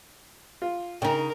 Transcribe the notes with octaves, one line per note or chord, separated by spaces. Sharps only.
F4
C#3 D#4 A#4 G5